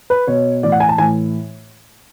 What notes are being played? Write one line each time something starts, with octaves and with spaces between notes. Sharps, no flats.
B4
B2 C#5
A2 E3 D5
F#5
G#5
A5
A2 E3 G#5